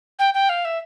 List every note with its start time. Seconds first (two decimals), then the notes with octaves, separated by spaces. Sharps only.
0.19 G5
0.34 G5
0.49 F5
0.65 E5